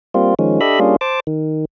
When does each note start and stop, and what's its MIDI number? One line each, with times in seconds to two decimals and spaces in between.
0.14 0.34 55
0.14 0.34 58
0.14 0.34 60
0.14 0.34 65
0.39 0.60 51
0.39 0.60 53
0.39 0.60 56
0.39 0.60 61
0.61 0.80 62
0.61 0.80 67
0.61 0.80 69
0.61 0.80 75
0.61 0.80 76
0.61 0.80 83
0.80 0.96 55
0.80 0.96 58
0.80 0.96 61
0.80 0.96 62
0.80 0.96 65
0.80 0.96 68
1.01 1.20 72
1.01 1.20 81
1.01 1.20 86
1.27 1.65 51